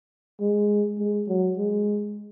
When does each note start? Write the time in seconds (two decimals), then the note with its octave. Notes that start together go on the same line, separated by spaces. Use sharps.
0.40 G#3
0.99 G#3
1.28 F#3
1.58 G#3